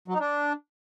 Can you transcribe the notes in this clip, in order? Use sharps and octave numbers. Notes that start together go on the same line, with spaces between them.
F#3
D#4
D4